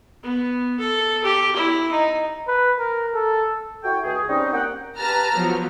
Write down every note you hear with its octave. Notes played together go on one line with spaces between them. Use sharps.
B3
A4
G4
E4
D#4
B4
A#4
A4
E4 F#4 A4 C#5 G5
C#2 G#4
G3 C4 C#4 D#4
A#3 F#5 G5
G4 B4 A5 A#5 F6
F3 F#3 B3